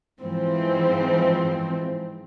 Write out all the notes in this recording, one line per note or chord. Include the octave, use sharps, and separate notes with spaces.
G#2 E3 F3 C4